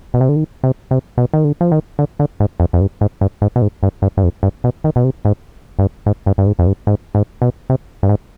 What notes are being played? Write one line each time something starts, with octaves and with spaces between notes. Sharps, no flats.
B2
C3
D3
D#3
C3
C3
B2
D#3
D3
F3
D#3
D3
D3
G#2
F2
F2
G2
G#2
G2
G#2
B2
G#2
G2
G2
G2
F2
G2
B2
D#3
B2
C3
G#2
G2
G#2
G2
G2
G#2
F2
G2
G#2
G#2
B2
C3
G2
G#2